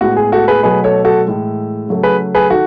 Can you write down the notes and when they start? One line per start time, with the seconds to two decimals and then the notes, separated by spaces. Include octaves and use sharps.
0.01 A2 G#3 B3 F#4
0.17 G#4
0.32 F#4 A4
0.48 G#4 B4
0.63 B2 F#3 A3 G#4 B4
0.84 A4 C#5
1.05 F#4 A4
1.26 A2 E3 G#3
1.88 C#3 F#3 A3
2.03 G#4 B4
2.35 G#4 B4
2.50 D#3 F#4 A4